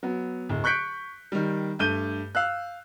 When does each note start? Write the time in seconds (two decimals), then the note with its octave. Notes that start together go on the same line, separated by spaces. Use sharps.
0.03 F#3 B3
0.49 D1
0.64 C#6 F#6 G6 B6 C#7 D7
1.32 D#3 G3
1.79 G2 A3 G6 D#7 G7
2.35 F5 E6 F#6